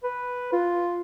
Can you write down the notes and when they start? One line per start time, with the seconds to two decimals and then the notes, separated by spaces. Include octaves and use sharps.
0.04 B4
0.53 F4